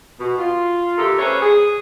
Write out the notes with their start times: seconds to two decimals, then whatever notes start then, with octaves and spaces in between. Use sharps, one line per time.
0.19 B2
0.38 F4
0.98 D3 A3 G4 A4 A#4
1.19 B3 C#4 C5 C#5
1.41 G#4